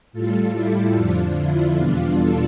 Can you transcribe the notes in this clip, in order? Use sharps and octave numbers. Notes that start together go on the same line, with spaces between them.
A2 G3 F4 A4
E4 G4
F2 D3 F3 D4 F4
E4
E2 B2 G3 D4 F4
F4 A4